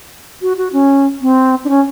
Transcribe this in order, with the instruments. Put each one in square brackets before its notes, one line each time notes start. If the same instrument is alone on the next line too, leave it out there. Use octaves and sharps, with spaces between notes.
[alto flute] F#4
F#4
C#4
C4
D4
C#4